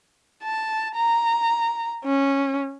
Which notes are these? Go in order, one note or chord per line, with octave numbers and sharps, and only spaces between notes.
A5
A#5
C#4